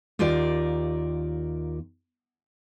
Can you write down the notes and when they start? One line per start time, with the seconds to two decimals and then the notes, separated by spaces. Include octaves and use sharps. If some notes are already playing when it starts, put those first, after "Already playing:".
0.19 D#2 F4 G4 A#4 D5